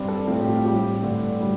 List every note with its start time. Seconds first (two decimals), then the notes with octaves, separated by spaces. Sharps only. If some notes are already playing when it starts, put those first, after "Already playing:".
Already playing: G2 G3 C4 D5
0.08 A4
0.27 A2 F3 A3 C4 F4
0.40 G4
0.52 F4
0.65 A2 G3 C4 G4
1.03 G2 D3 A3
1.40 A2 G3